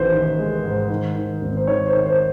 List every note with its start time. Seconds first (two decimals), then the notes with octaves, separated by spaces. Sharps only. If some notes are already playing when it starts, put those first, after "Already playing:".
Already playing: A1 D#3 B4 C5
0.12 D#3
0.38 G#3
0.64 G#2
0.90 D#3
1.15 D#3
1.42 G#1
1.57 C5
1.67 D#3 C#5
1.86 C5
1.93 D#3
2.06 C5